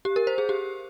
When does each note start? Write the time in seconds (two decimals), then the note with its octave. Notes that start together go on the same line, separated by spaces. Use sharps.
0.05 G4
0.16 A#4
0.27 C5
0.38 G#4
0.49 G4